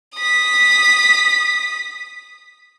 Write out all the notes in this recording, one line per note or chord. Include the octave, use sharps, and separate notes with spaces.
D#6 B6